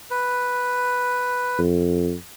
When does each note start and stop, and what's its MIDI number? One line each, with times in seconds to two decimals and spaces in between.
0.10 1.60 71
1.59 2.14 41